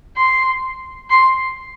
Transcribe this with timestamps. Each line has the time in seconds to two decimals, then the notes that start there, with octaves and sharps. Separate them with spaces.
0.16 C6
1.10 C6